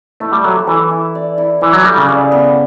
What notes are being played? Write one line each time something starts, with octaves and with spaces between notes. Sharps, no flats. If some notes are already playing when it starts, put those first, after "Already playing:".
A3 E4
G3
F#3 A4
E3 A4
E4
D5
E4
E3 E4
F#3
G3 A4
C#3
D5
B3